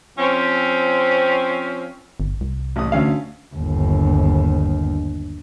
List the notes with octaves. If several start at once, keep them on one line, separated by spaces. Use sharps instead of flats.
F3 C4 C#4
G1
C2
A1 D#6
D2 C#4 F5
G1 D#2